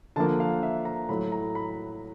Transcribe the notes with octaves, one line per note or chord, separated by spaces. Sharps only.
D3 F3 A#3 A5
F5
E5
A#5
A2 F#3 A3 B5
A#5
B5